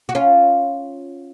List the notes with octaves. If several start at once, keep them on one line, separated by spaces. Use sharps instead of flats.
F#4
C#4 F4